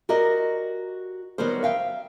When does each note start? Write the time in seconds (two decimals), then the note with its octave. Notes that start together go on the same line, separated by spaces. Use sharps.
0.09 F#4 G4 A#4 D5 D#5
1.38 D#3 F#3 G3 B3 A#4 C5
1.63 E5 F5 G5